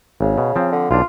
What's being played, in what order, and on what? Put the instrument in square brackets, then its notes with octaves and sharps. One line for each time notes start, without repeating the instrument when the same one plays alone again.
[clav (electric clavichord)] G#1 [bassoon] C#3
[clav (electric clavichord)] B2
F3 C4
[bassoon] D3
[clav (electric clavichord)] B1 D4 [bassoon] F4